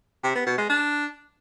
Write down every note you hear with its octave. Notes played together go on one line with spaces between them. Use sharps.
C3
B3
B2
G#3
D4